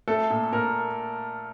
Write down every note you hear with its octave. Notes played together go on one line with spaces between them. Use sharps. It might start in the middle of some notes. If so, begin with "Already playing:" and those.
A3 A4
A#2
A#2 A#4